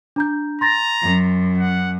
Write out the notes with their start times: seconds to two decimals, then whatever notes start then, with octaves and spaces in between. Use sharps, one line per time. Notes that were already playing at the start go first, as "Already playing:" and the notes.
0.16 D4 A#5 G6
0.61 A#5 C6 A6 A#6
1.02 F#2
1.58 F#5